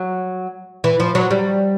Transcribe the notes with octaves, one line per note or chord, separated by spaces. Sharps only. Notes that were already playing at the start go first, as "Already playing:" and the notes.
Already playing: F#3
E3
F3
F#3
G3